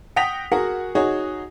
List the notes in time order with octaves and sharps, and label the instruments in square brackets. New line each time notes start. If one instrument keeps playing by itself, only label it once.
[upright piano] F#5 G5 D#6 A#6 B6 F7
F#4 G#4 A#4 F#5
D#4 F#4 G#4 C#5